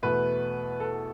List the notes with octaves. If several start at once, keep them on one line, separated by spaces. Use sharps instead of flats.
E2 B2 A3 B4
A4